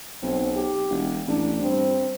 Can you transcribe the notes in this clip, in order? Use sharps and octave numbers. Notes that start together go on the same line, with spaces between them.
B1 C4
G4
E1
A1 D4
G2 C4